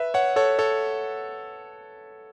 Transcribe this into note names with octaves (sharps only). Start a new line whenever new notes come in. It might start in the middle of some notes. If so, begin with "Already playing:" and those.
Already playing: B4 E5
C#5 F#5
A4 C#5
A4 C#5